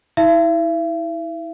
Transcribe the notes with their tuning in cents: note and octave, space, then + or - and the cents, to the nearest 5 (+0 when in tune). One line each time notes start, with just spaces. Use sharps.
E4 -30 E5 +40